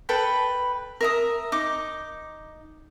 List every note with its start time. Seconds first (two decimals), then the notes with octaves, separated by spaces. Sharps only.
0.09 A4 B4 G5 B5
1.01 A#4 E5 D#6
1.52 D#4 D6